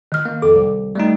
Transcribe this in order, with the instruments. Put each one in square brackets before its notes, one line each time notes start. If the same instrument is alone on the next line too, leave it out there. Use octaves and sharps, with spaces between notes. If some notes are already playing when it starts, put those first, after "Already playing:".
[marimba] D#3 F6
[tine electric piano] A#3
[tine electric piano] F2 D6 [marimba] A4
[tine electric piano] C2
G3 A3 D#4